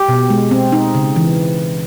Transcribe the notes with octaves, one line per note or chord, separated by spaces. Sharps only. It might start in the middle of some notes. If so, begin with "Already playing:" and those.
Already playing: G4
B2
G#3
C4
D#4
C#3
E3